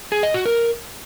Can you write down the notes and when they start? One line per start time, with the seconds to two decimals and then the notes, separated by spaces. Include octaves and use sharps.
0.12 G#4
0.23 D#5
0.34 F#4
0.46 A#4